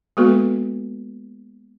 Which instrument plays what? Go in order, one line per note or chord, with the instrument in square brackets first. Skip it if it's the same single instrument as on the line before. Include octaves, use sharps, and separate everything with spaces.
[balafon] G#3 A#3 B3 F#4 A4 B4